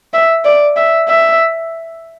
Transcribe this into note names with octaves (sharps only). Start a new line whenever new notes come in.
E5
D5
E5
E5